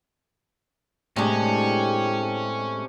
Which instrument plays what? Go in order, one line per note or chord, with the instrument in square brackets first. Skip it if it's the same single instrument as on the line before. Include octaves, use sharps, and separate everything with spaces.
[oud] A2 G#3 [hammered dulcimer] C3 D4 G4 [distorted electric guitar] C#4